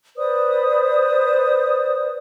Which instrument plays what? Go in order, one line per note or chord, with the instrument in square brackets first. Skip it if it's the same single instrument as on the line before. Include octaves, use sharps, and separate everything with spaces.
[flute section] B4 C5 D5 D#6